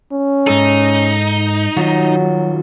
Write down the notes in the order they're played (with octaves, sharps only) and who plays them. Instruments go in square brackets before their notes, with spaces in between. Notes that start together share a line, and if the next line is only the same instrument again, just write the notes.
[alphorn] C#4
[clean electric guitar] G#2 A4 [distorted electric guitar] D#4
[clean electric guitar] D#3 F4 F#4 [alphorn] F#3